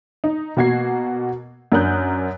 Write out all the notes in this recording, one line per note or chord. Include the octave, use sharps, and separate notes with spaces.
D#4
B2 A#3 F#4 G#6 C7
F#2 D4 A#4 D#6 F#6 G6